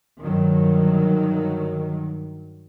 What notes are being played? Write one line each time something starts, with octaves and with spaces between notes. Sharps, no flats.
G2 D#3 F#3